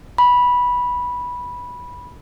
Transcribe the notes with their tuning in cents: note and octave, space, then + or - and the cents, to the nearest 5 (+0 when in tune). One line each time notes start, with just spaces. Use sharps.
B5 -10